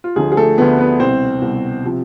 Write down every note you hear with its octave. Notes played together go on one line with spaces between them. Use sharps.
F4
D2 D3 F3 G#4
G#4
A3 A4
D2 D3 F3 B3 B4
B3 B4
C2 B2 C4 C5
C2 B2
C3 F3